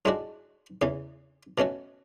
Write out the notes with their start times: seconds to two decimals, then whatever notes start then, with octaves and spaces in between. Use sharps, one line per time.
0.05 A2 G#3 D4 F#4
0.82 E2 C#3 E3
1.58 B2 A3 C#4 F#4